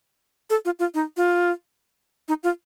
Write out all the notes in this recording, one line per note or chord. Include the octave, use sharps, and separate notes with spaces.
A4
F4
F4
D#4
F4
D#4
F4